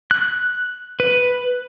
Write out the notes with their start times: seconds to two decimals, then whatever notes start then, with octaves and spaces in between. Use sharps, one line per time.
0.11 F#6
1.00 B4